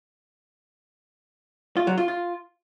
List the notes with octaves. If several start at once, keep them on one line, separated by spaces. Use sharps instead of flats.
F4
F#3
F4
F4